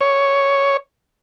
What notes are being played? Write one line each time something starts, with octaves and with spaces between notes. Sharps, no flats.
C#5